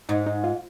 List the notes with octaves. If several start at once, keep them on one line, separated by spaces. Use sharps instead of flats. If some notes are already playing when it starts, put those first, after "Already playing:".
G#2 D#4
D#4
F4